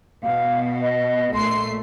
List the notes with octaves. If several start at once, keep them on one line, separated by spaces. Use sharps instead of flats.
B2 F5
D#5
A#1 A3 C6 C7